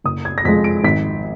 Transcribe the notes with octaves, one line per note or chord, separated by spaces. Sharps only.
F#1 D#6
G#6
A#6
F2 F3 G#3 B6
D7
G#1 B6